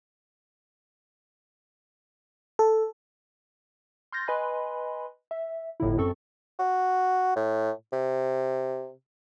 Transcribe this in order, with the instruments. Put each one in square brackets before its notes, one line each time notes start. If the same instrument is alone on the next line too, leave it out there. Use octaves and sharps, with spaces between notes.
[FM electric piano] A4
[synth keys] C6 F6 G6 A6 A#6
B4 D#5 G#5 B5 C6
E5
G1 A2 D3 E4
F#2 C4 A4 C#6
[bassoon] F#4
A2
C3